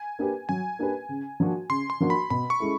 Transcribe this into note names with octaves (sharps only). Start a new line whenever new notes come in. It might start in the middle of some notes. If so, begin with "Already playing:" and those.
Already playing: G#5
A#3 D4 G4 B4
F#3 G#5
A#3 D4 G4 B4
C#3
F3 A#3 D4 F#4
C#3 C6
C6
F3 A#3 D4 F#4
B5
B2 B5
C#6
G#3 C#4 E4 A4